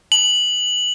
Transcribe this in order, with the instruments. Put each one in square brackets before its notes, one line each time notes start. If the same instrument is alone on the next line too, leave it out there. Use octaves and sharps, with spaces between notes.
[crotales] F#7